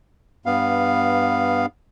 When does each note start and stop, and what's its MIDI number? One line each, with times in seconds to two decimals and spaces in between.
0.46 1.66 43
0.46 1.66 59
0.46 1.66 77